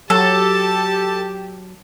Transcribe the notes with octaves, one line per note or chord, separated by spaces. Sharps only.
F#3 G4 A4 A5